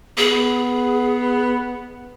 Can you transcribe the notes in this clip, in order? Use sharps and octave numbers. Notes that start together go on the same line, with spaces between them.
B3 G#4